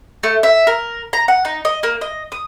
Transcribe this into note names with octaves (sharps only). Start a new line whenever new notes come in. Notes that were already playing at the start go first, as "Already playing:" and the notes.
A3
E5
A#4
A#5
F#5
D#4
D#5
A#3
D#5
D#6